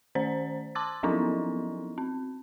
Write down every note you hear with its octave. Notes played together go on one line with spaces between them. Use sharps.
D#3 C#4 C5 D5
A5 C6 D6 E6 A6
F3 F#3 B3 C#4 D#4 E4
C4